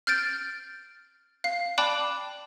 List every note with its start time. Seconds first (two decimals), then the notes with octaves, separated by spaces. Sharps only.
0.07 F6 G6 A6 D7
1.44 F5 C7
1.78 D5 G5 A5 B5 D6 F#6